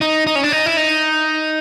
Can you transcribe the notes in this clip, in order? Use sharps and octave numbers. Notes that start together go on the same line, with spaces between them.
D#4
D#4
C#4
D4
D#4
E4
D#4